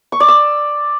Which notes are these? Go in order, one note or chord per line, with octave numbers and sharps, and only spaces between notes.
C#6
D5
E6